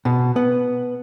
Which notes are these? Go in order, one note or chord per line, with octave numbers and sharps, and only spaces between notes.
B2
B3